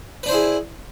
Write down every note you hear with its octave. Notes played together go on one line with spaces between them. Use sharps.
D4 E4 G#4 B4 C5